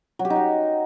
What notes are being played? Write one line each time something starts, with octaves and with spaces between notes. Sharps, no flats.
F#3
G4
D#4
F#4